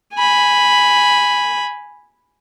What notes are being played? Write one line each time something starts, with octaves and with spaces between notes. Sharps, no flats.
G#5 B5